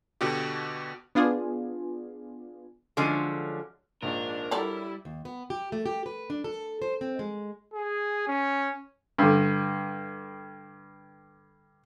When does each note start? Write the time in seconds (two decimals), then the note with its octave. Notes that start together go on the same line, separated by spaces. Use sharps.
0.21 B2 D3 F#4 G4
1.15 B3 D4 F4 G#4
2.97 D3 F3 F#3 G#3 C#4
4.02 A#1 G#2 D4 A#4
4.51 F#3 G3 E4 A4 D5 A#5
5.05 D#2
5.25 B3
5.50 G4
5.72 A3
5.86 G4
6.06 B4
6.30 D4
6.44 A4
6.82 C5
7.01 C4
7.19 G#3
7.74 G#4
8.27 C#4
9.18 G2 D3